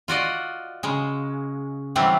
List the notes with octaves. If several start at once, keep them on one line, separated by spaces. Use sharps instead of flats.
F4 F#4 D5 D#5
C#3 G#3
C3 E3 F#3 G3 C4